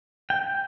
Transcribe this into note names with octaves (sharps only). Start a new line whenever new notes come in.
G5